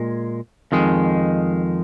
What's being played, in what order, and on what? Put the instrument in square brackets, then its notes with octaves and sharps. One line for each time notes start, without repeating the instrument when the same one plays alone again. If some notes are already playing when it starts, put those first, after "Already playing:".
Already playing: [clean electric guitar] A#2 G#3
F2 D#3 G#3